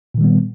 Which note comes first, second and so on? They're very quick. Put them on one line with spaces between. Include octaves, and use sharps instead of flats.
A#2 D#3 G3 B3